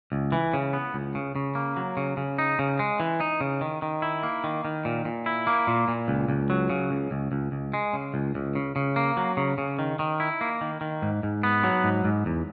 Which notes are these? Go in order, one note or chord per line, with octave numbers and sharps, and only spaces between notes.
C#2
E3
C#3
B3
C#2
C#3
C#3
A#3
F#3
C#3
C#3
D#4
C#3
G#3
E3
D#4
C#3
D#3
D#3
E4
A#3
D#3
D#3
A#2
A#2
E4
A#3
A#2
A#2
C#2
C#2
F#3
C#3
C#2
C#2
C#2
C#2
G#3
C#3
C#2
C#2
C#3
C#3
A#3
F#3
C#3
C#3
D#3
D#3
E4
A#3
D#3
D#3
G#2
G#2
B3
F#3
G#2
G#2
E2